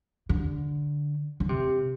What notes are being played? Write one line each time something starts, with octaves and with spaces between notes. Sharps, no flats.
D3
D3
C3